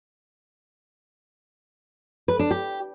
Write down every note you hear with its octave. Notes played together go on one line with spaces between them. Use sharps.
B4
D4
G4